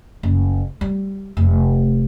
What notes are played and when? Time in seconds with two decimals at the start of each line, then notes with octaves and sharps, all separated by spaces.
0.23 F#1
0.81 G3
1.37 F1